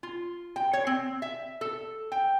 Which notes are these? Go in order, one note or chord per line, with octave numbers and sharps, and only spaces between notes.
F4
G5
C#5
C4
E5
A4
G5